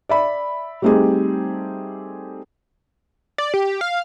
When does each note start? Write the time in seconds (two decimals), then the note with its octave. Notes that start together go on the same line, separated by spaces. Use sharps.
0.09 D5 E5 B5
0.82 G3 A3 C4 D#4 G4 G#4
3.38 D5
3.54 G4
3.81 F5